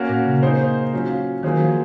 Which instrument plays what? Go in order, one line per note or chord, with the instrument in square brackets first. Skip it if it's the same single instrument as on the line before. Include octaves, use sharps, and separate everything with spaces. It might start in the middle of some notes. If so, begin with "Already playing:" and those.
Already playing: [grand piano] A#3 C#4 F#4 A#4
[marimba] A#2
C#3
[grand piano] A#3 D#4 G#4 C5
F#3 C#4 F4
[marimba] D#3 [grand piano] F#3 A#3 F4 G#4 C5
[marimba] F3